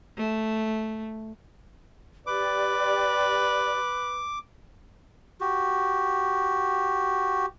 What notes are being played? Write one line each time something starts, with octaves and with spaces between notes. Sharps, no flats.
A3
G4 B4 D5 D6
F#4 G4